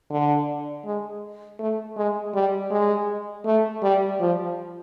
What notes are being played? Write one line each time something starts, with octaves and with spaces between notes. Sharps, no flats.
D3
G#3
A3
G#3
G3
G#3
A3
G3
F3